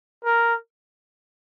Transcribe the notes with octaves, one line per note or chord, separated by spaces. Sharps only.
A#4